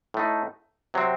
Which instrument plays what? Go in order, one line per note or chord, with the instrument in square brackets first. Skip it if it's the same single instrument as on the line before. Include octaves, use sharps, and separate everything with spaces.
[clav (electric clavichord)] A2 A3 D#4
C3 F#3 C4